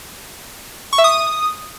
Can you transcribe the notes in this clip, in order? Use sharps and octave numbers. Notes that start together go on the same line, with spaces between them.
C#6
E5
D#6